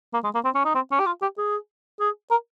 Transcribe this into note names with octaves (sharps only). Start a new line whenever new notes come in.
A#3
G#3
A#3
C4
C#4
D#4
C4
C#4
G4
F4
G4
G#4
G#4
A#4